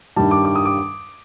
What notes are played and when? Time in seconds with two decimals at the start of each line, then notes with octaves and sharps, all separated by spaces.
0.16 G2 D#3 G3 A5
0.31 D6
0.45 D6
0.55 D#6
0.65 D6